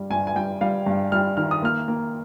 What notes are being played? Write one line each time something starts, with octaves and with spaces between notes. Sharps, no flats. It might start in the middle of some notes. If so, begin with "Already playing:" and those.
Already playing: G2 G3
G2 G#5
G#5
G3 G5
G3 F5
G2
G3 F6
D#3 F6
D#6
A#3 F6
A#3